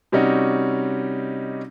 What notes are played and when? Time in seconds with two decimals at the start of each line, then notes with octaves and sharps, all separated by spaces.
0.12 C3 G3 C#4 D#4 F#4